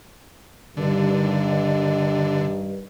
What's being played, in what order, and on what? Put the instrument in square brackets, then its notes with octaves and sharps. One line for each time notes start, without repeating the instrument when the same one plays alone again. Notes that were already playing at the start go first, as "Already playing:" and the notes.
[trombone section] G2 D#3 [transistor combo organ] D3